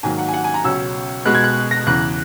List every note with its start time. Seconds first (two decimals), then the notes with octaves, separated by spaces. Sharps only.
0.03 G#2 D#3 F#3 A#3 G#5
0.19 F#5
0.28 G#5
0.34 F#5
0.44 G#5
0.54 A#5
0.64 C#2 B2 F#3 C#4 E6
1.25 B2 G#3 B3 F#6
1.35 G#6
1.44 F#6
1.71 A#6
1.87 E2 C#3 E3 F#6